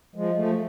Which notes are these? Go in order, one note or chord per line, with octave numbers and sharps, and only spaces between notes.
F3 G#3
F3 A3